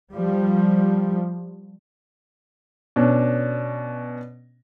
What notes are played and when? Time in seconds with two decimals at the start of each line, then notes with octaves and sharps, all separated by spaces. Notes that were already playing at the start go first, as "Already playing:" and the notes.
0.11 F3 G3
2.96 B2 C#4 D4